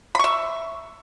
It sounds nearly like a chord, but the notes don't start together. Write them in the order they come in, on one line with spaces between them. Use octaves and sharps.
B5 C#6 E5